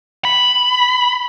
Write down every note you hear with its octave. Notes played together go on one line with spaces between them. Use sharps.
B5